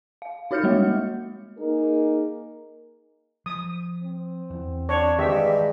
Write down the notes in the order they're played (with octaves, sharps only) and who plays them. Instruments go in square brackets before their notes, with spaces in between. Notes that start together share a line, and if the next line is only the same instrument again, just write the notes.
[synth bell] F5
D#4 F#4 C#5 F6 G6 C#7
G3 G#3 A#3
[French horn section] A#3 D#4 G#4 A#4
[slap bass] F3 [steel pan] D#6
[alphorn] C4
[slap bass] E2
[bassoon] D4 [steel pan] C#5
[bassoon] G2 [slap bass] D#3 E3 [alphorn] G#3 [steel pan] G4 E5